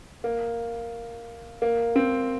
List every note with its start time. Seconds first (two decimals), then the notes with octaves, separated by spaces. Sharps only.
0.24 A#3
1.62 A#3
1.96 C4